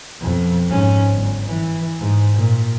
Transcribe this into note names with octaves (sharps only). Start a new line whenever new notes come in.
F2 B2
G#2 C#4
G1
E3
G#2
A#2